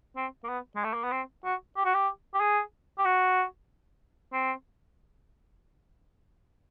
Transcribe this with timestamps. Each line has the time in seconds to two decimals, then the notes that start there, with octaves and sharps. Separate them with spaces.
0.16 C4
0.44 A#3
0.49 B3
0.76 G#3
0.84 A3
0.94 A#3
1.04 B3
1.12 C4
1.45 F#4
1.76 G4
1.85 F#4
1.94 G4
2.34 G4
2.41 G#4
2.98 G4
3.05 F#4
4.33 C4